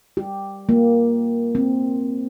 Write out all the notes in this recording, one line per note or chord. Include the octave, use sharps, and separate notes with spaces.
G4
A#3
C4